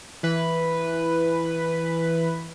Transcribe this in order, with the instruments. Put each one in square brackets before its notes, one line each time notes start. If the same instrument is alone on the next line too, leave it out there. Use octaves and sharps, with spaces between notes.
[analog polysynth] E3 B4